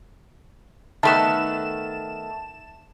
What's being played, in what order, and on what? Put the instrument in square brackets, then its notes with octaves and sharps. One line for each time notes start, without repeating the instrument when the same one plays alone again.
[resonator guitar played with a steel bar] D#3 A3 B3 [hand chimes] E5 [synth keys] A5 E7